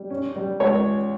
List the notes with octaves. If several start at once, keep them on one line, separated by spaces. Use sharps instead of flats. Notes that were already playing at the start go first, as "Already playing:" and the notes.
Already playing: G3
C#4
G3
C#2 C#5